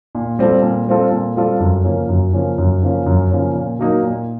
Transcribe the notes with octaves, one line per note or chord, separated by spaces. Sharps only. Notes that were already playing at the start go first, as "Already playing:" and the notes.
A#2
G3 C4 F4 A4
A#2
G3 C4 F4 A4
A#2
G3 C4 F4 A4
F#2
C#3 F3 A#3 C#4
F#2
C#3 F3 A#3 C#4
F#2
C#3 F3 A#3 C#4
F#2
C#3 F3 A#3 C#4
A#2
F#3 A#3 D#4
A#2